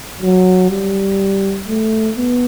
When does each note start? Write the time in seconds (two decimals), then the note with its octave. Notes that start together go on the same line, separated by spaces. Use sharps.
0.22 F#3
0.71 G3
1.68 A3
2.17 B3